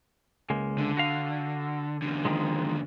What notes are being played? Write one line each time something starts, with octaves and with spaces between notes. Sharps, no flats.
C#2 G#3 A#3
D3
F#4 F5
E2 D3
D#3 F3 G#3